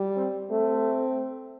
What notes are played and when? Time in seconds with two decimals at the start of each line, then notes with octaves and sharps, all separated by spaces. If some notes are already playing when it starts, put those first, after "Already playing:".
Already playing: G3
0.16 C4
0.50 A3 C4